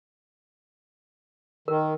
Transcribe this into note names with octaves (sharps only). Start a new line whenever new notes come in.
D#3 A#4